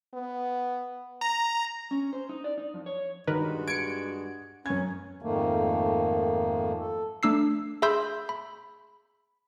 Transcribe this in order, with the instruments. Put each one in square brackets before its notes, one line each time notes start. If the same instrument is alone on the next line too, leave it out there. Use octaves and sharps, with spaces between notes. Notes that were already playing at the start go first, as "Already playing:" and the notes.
[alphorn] B3
[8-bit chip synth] A#5
[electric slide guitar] C#4
C5
D#4
D5
D#4
F2
C#5
[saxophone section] G2 G#3 F#4 [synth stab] D#3 A#4 B4
[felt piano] G#6 [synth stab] C#7 D7
[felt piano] F#2 G#6 [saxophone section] C#4
[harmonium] F2 G#2 D#3 A3 A#3
A4
[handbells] A3 D4 E6 C7
G#4 E5 B5 C6 E6 G6
B5